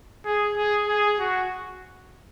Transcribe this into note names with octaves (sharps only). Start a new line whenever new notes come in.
G#4
G#4
G#4
F#4